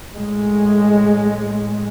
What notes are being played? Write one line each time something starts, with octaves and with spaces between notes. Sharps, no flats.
A2 G#3